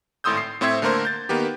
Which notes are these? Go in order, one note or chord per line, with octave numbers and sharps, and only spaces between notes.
G#1 A2 C6 D#6 E6 G6
C7
A2 C4 C5 E5 G#6
D3 A3 A#3 A#4 C5
G6 A6
D#3 A#3 B3 G4